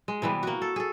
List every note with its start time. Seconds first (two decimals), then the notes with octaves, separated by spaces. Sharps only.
0.08 G#3
0.22 C3 E3 G3 B3
0.43 A#3 F#4
0.62 A4
0.76 G#4 A4